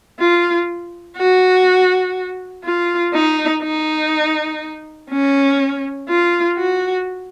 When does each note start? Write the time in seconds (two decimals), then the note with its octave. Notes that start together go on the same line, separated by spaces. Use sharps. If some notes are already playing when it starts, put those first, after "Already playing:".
0.20 F4
1.18 F#4
2.64 F4
3.14 D#4
3.63 D#4
5.10 C#4
6.09 F4
6.57 F#4